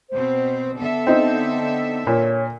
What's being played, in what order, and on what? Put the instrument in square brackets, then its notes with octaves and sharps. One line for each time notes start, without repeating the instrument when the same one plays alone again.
[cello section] B2 C4 [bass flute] C5
[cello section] D3 A4 E5 [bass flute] B3
[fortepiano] C4 D#4
[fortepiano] A#2 [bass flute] C#5